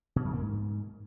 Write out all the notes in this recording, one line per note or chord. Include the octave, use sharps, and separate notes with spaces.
B2
F#2
A#3
G#2